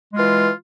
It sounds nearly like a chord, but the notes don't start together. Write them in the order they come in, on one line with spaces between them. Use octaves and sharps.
G#3 F4 E3